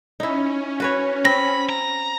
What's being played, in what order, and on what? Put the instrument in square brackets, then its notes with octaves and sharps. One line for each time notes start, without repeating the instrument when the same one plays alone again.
[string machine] C#4 [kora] D#4 E4
[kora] F#4 B4 C#5
[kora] C4 [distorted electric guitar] B5 [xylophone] A#6
[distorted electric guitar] A#5